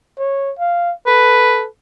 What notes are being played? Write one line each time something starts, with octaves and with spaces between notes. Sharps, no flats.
C#5
F5
A4 B4